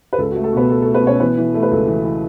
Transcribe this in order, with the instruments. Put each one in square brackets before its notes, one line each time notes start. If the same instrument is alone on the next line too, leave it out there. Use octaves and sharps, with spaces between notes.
[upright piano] B4
C#2 A4
A3 F#4
A4
B2 B3 B4
A3 A4
A3 A4
B3 B4
B2 C#4 C#5
E3 B3 B4
E3
A3
B4
C#2 A4
E3
E3